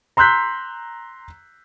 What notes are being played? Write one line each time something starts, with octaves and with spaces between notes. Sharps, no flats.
A#5 C6 E6 F#6 G6 B6